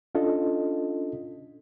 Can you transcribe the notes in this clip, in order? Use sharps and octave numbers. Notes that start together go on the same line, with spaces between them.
C#4 D4 F4 A4 D#5